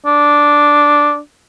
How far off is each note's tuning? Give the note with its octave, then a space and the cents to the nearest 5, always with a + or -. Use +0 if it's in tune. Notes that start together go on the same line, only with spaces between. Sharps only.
D4 -5